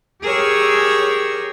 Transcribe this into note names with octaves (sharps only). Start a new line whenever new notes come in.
G4 G#4 A#4 C#5 E6